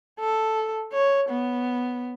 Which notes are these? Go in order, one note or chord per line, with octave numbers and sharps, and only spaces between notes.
A4
C#5
B3